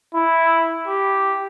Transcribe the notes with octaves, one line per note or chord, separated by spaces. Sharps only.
E4
G4